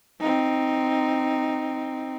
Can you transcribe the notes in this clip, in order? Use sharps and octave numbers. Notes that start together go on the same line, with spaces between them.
C4 D#4